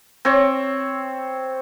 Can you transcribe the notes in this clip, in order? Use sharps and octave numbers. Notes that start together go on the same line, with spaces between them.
C4 C#5